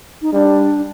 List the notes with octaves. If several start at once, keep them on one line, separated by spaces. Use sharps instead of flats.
D#4
G3 D4